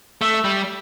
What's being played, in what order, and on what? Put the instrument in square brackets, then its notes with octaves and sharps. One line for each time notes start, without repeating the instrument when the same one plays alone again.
[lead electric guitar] A3 [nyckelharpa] E5
[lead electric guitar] G3